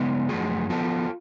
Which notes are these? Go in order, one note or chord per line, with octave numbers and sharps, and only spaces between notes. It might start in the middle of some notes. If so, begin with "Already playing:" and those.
Already playing: C#3 G#3 B3
F#2 F3 A3 F4 G#4
F3 B3 F4 A4